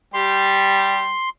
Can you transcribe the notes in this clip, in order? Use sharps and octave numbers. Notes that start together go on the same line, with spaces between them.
G3 G4 C6